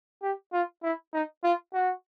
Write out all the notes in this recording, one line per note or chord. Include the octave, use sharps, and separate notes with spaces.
G4
F4
E4
D#4
F4
F#4